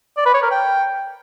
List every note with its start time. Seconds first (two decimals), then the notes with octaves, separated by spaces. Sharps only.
0.17 D5
0.25 B4
0.34 C#5
0.42 A#4
0.51 G5